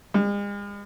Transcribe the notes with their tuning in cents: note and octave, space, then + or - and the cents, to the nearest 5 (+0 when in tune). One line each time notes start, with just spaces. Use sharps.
G#3 -45